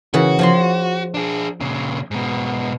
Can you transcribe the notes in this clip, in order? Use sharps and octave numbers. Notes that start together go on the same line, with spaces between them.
C#3 E3 F#4
F3 C#5 C6
D4 G#4
A#2 C#3
G#2 B2